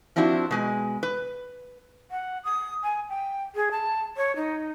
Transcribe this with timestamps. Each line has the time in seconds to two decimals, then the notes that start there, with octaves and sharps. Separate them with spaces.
0.16 F3 C4 D4 E4 F#4
0.51 B2 G#3 G#5
1.03 B4
2.11 F#5
2.44 D#6
2.83 G#5
3.09 G5
3.55 G#4
3.71 A5
4.17 C#5
4.36 D#4